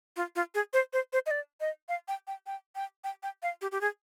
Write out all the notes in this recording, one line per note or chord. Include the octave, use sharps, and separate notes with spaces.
F4
F4
G#4
C5
C5
C5
D#5
D5
D#5
F5
G5
G5
G5
G5
G5
G5
F5
G4
G4
G#4